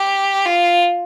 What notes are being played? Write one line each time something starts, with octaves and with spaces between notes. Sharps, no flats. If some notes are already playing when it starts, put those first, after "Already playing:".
Already playing: G4
F4